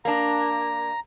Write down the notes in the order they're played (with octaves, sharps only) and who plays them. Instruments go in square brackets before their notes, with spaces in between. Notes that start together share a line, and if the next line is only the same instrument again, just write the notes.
[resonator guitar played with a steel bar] A#3 D4 [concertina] A#5